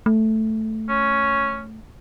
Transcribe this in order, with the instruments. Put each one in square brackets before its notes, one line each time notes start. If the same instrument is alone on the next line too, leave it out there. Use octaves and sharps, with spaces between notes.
[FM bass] A3
[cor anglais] C#4